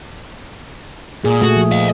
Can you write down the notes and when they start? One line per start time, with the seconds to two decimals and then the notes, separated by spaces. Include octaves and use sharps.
1.24 A#2 G#4
1.42 A#2 A3 F#4
1.56 F3
1.72 D#5 F5